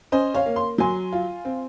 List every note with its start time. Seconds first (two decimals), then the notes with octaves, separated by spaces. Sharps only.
0.12 C#4 C5 D#5
0.34 C#5 F5
0.46 A#3
0.56 C6
0.78 F#3 G#5 C6
1.12 F4
1.45 C4